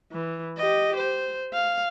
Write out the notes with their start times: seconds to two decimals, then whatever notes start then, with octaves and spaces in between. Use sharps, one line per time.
0.12 E3
0.57 G4 D#5
0.96 C5
1.53 F5